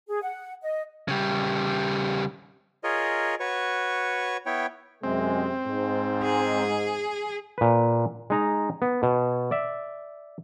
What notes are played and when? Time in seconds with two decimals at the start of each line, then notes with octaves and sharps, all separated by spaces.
0.08 G#4
0.22 F#5
0.62 D#5
1.08 C#3 G3
2.84 F4 G#4 A#4 C#5 D#5
3.40 F#4 B4 C#5 C#6
4.46 B3 E4 C#5 G5
5.04 F#2 C3 G#3 C4
5.65 G#2
6.23 G#4
7.58 A#2 B4
8.30 G#3 D#4 A#5
8.82 B3
9.03 B2
9.51 D5 E5